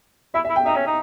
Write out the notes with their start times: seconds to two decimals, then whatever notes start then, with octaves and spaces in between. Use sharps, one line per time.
0.34 E4 E5
0.45 E5
0.50 E4
0.56 G5
0.66 D#4 E5
0.76 C#4
0.87 D#4